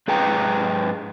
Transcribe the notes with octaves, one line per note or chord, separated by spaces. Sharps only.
G#2 G#4 B4 G5 A#5